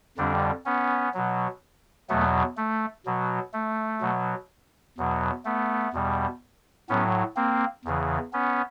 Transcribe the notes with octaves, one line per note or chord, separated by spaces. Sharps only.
F2 D3 G3 C4 D4
B3 C#4
B2 F#3
E2 B2 F#3 A3 B3
A3
B2 F#3
A3
B2 F#3
E2 B2 F#3
A3 B3
E2 B2 G3
A2 F#3 B3 C#4
A#3 C4
E2 C#3 E3
B3 C#4